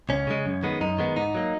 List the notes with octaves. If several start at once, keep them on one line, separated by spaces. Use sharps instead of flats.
C#2 C#4
C#3 G#3
F#2
D#3 G#3 B3
F#2 D#4
D#3 G#3 B3
G#2 D#4
F#3 A#3